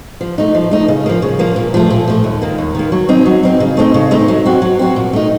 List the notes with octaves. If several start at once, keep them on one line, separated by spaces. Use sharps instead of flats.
F3
A3 D#4
F3
A3 D#4
C#3
F3 A#3
C#3
F3 A#3
A#2
F3 A3
A#2
F3 A3
D#2
D#3 A#3
D#2
D#3 A#3
F#3
C4 D#4
F#3
C4 D#4
C#3
A3 C4 D#4
C#3
A3 C4 D#4
F#3
C4 F#4
F#3
C4 F#4
A#2
A3 D#4